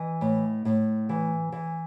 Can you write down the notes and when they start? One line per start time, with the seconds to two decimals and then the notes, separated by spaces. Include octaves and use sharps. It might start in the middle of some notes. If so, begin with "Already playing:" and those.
Already playing: E3 D#5
0.21 A2
0.65 A2
1.09 E3
1.52 E3